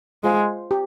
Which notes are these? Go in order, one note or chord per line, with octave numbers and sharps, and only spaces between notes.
G#3 F4 C5 F5 C6
G4